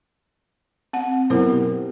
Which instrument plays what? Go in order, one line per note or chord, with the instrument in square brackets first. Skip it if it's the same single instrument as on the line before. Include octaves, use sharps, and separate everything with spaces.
[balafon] C4 F#5
[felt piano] B2 F#3 B3 [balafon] E4 A#4 C5
[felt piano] G4